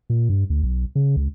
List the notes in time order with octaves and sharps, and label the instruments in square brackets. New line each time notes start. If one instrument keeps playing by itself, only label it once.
[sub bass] A#2
G2
D2
B1
C#3
C#2